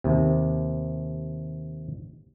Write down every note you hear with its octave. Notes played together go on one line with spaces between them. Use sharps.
D#2 C3